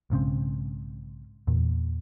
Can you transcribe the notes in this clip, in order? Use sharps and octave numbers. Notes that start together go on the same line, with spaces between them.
B1 G#2 C#3 C4
E2 A#2